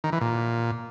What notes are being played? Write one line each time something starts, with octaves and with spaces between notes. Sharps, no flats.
D#3
E3
A#2